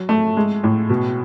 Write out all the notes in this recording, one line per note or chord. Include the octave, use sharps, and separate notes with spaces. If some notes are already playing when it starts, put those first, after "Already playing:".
Already playing: F#3
A3
G#3
A2
B2